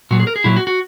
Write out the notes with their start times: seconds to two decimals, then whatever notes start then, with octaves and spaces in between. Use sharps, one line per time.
0.11 A#2 F#3 F#4
0.19 G#4
0.27 A#4
0.36 G#4
0.44 A#2 F#3 E4
0.56 F#4
0.67 F#4